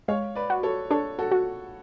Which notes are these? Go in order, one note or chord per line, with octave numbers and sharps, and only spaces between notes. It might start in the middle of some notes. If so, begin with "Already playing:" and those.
G#3 C#5 F5
B4 D5
F#4
A4 C#5
D4 A4 C#5
F#4 A4
F#4